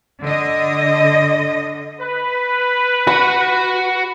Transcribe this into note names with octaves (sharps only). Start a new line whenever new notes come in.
D3 D#5
B4
F#4 F#5 B5